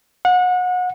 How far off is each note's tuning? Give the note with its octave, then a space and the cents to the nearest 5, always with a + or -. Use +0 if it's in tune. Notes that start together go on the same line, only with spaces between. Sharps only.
F#5 -30